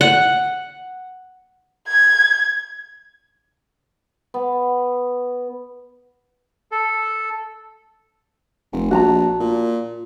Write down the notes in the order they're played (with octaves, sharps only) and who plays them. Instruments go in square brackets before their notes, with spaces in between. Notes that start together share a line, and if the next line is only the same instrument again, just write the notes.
[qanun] F#5
[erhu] G#6
[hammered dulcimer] B3
[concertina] A4
[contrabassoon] F1
[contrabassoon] A#1 [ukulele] F#4 A5 A#5
[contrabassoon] A#2